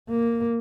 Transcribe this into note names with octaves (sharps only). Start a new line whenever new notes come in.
A#3